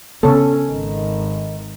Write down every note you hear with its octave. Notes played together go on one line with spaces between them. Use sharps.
C#3 B3 C#4 A4 C#5
G#1 D#3